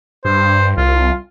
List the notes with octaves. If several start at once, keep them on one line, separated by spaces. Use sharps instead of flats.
G2 C5
C2 F4